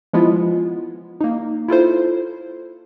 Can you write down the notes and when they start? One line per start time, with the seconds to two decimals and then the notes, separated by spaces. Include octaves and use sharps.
0.13 F3 G#3 B3 E4 F4
1.21 A#3 D#4
1.68 E4 F4 A4 C5